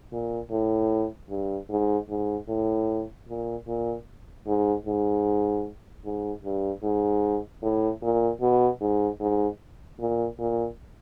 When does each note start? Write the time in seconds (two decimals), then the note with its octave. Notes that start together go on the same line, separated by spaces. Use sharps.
0.12 A#2
0.51 A2
1.30 G2
1.70 G#2
2.09 G#2
2.48 A2
3.28 A#2
3.67 A#2
4.47 G#2
4.86 G#2
6.05 G#2
6.43 G2
6.83 G#2
7.63 A2
8.02 A#2
8.41 B2
8.81 G#2
9.20 G#2
9.99 A#2
10.39 A#2